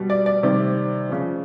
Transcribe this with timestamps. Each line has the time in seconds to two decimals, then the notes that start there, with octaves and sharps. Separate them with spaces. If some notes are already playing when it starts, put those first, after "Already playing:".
Already playing: B2 G3
0.10 D5
0.26 D5
0.43 C3 D#3 G3
1.09 C#3 F3